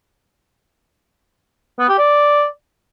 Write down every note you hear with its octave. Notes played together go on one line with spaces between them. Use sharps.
B3
G4
D5